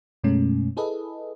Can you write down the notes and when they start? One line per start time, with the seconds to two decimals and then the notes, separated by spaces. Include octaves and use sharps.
0.24 F#2 B2 G#3 A3 C#4
0.77 E4 G#4 A4 B4 D#5